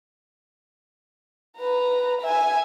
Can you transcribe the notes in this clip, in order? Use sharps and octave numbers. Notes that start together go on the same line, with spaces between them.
B4 A#5
E5 G#5